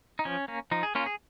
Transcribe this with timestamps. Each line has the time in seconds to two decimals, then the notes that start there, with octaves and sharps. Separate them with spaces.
0.19 D#4
0.25 F3 C#4
0.48 A#3 C#4
0.71 F3 D#4
0.83 G#4
0.95 A#3 C#4 F4
1.06 G#4